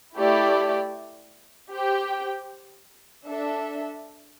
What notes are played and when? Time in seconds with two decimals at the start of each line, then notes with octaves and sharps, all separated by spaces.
0.17 A3 E4 G4 D5
1.71 G4 C5 G5
3.26 D4 A4 E5